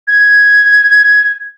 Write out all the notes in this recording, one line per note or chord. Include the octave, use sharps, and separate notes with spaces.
G#6